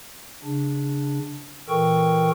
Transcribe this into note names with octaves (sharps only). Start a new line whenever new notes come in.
C#3 D4
A#2 E3 A4 A#4 G5 C#6